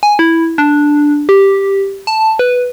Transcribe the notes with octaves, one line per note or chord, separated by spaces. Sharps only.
G#5
E4
D4
G4
A5
B4